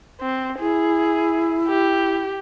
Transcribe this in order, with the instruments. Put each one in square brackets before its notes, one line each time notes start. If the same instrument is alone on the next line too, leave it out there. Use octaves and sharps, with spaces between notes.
[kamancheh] C4
[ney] E4 [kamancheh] G#4
[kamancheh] G4